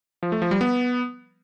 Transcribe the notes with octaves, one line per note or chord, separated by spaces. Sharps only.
F3
A3
F3
G3
B3